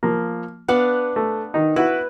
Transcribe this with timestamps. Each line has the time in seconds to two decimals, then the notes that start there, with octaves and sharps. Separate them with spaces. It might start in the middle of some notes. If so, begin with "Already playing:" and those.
0.03 F3 A#3
0.68 B3 D4 F5 F#5
1.16 A3
1.54 D#3 D#4
1.76 E4 F#4 B4